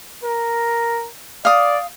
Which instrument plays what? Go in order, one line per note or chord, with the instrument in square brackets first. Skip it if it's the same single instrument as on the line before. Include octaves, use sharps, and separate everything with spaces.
[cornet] A#4
[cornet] D5 [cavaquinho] F5 D#6